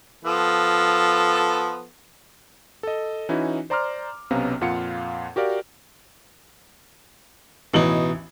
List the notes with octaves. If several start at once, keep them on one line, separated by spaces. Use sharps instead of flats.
F3 B3 A4
A4 D#5
E3 C#4 D#4 E4 F#4
C5 D5 A#5 C6 D6 F6
B1 C3 B3 C#4 F5 A#5
F2 A#2 F4 F5 F#5 C#7
F#4 G4 A#4 D5 F5
A1 B2 E3 D#4 F#7